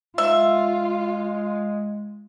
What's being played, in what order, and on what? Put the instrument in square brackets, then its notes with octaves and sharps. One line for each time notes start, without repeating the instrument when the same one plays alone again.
[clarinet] G#3 [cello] F4 [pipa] E5